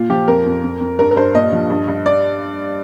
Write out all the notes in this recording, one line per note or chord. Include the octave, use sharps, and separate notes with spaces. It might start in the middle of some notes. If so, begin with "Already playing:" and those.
Already playing: A#2 F4
F3 G4
F2 A#4
F2
F2
F2
G2 A#4
A#4
G2 C5
A#2 D#5
F3
G2
G2
D5